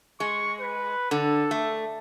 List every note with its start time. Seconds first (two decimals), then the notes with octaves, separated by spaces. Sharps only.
0.20 G#3 C#6
0.60 B4
1.11 D3 A4
1.51 A3